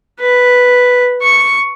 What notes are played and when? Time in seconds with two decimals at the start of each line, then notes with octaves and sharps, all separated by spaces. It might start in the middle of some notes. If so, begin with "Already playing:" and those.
0.20 B4
1.22 C#6